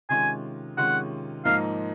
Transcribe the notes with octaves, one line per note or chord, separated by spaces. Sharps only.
C3 D#3 G#3 C#4 F4 G#5
C3 D#3 G#3 C#4 F4 F#5
G#2 F3 A#3 D#4 F5